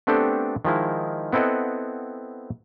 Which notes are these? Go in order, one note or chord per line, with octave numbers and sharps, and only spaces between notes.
A3 B3 C4 D4 G4 A4
D#3 F3 G#3 E4
B3 C4 E4 A4 D#5 F#5